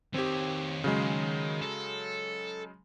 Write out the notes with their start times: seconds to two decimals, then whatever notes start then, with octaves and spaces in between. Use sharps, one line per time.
0.14 D#3 C4 G4 C#5
0.84 C#3 F#3 G#3
1.62 A4